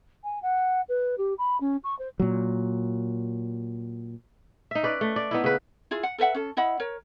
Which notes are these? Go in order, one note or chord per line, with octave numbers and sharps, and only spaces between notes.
G#5
F#5
B4
G4
B5
C#4
C#6
C5
A#2 F#3
D#4 E5
C#4 B4 D5
A3
D5
B3 D#4 E4
C#3 B4
E4 F4 G#4
F#5
A4 B4 E5 F#5
C#4 A4
E4 D#5 F#5 B5
A#4 C#5